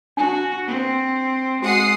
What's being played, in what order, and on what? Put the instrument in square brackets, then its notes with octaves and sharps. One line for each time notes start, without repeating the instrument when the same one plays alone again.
[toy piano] D4 [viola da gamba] F#4
[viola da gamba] C4
[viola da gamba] G#3 [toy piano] F#4 [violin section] F#5 D#6 C7